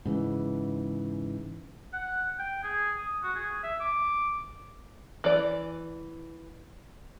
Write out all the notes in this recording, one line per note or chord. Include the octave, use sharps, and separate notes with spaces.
G#2 C#3 E3
F#5
G5
G#4
D#6
F#4
G#4
E5
D6
E3 D5